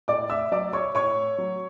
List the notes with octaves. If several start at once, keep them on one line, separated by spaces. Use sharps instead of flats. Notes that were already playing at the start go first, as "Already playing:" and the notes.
A2 D5 D6
E5 E6
F#3 D5 D6
C#5 C#6
A2 C#5 C#6
F#3